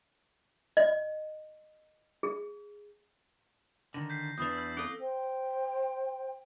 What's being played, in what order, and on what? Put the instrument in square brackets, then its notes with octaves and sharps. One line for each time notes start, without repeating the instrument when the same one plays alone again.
[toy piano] D#5
G#4
[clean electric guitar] D3 D#3 [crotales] A#6
[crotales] G6 B6 C7
[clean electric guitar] E2 E3 D4 [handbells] B4 D#6 [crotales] G6
[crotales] E6 G6
[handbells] C4 A4 [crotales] D#6 G7
[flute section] C5 G5